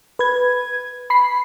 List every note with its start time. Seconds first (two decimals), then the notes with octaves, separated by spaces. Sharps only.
0.19 B4 G#6
1.10 B5 B6 C7